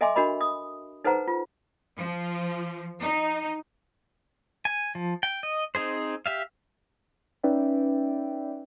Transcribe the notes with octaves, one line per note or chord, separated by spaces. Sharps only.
A4 D#5 E5 G#5 C6 D6
D4 F#4 A#4 D#5 B5
D#6
D#4 A4 B4 C5 F#5 A#5
F4
F3
D#4
G#5
F3
G5
D#5
C4 D#4 G#4 C5
G4 E5 F5
C#4 D#4 B4 D5 E5 G5